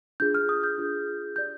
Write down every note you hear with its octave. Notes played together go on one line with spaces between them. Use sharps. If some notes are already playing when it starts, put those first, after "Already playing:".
D4 F4 G#4 G6
F6
D#6
G6
D4 F4 G#4
G4 D5 G6